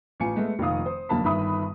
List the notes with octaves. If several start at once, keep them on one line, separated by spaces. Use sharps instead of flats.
A1 F4 G#5 C#7
G#3 A3 B3
F1 A#2 D#3 F5 D#6
C5
F1 F#2 D3 A#3 A5 B5
G1 G2 D#3 E5 B5 D#6